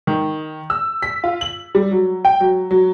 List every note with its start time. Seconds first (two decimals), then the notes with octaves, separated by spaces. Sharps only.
0.07 D#3
0.70 E6
1.02 B6
1.24 F4
1.41 F#7
1.75 G3
1.91 F#3
2.25 G5
2.40 F#3
2.71 F#3